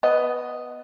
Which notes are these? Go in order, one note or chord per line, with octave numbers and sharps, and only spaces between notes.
B3 D#5